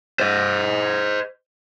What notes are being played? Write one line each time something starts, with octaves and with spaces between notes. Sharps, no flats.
C5 D#5